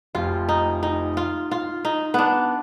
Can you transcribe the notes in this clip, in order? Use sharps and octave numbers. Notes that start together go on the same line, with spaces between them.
F1 F2 F3 F4
D#4
D#4
F4
F4
D#4
B3 D4